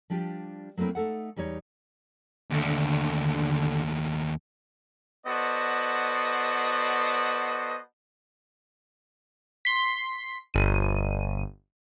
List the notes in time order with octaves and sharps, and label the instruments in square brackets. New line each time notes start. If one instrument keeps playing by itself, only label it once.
[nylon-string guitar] F3 G3 D4 F4 G4
F#3 A3 A#3 C4 E4
A3 D#4 A4 F#5
E2 G3 D#4 C#5
[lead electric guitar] D#2 A3 [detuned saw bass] D3
[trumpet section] B3 F#4 A4 C5 D5 D#5
[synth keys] C6 B6
G1 D#7